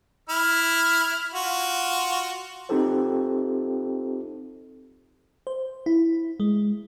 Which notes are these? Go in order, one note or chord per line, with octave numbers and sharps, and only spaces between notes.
E4 F6
F4 F#4
C4 D#4 F4 G4 A4 C5
C5
E4
G#3